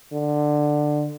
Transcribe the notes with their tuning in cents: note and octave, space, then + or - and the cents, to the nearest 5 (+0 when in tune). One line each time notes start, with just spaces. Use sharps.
D3 +15